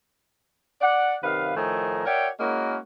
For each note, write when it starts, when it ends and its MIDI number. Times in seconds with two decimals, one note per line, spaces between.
0.81 1.15 74
0.81 1.15 78
1.22 1.52 42
1.22 1.52 48
1.22 1.52 51
1.22 1.52 71
1.22 1.52 77
1.55 2.03 45
1.55 2.03 51
1.55 2.03 53
1.55 2.03 57
1.55 2.03 80
1.55 2.03 82
2.06 2.28 66
2.06 2.28 70
2.06 2.28 73
2.06 2.28 74
2.06 2.28 76
2.06 2.28 79
2.40 2.77 56
2.40 2.77 58
2.40 2.77 61
2.40 2.77 64
2.40 2.77 66
2.40 2.77 70